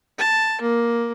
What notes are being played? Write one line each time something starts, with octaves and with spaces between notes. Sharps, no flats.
A5
A#3